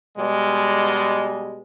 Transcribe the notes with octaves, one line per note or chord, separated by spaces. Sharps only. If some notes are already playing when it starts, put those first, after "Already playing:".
B2 G3 G#3